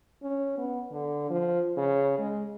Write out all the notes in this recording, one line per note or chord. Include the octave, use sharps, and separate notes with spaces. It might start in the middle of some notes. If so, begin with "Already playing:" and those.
C#4
B3
D3
F3
C#3
G#3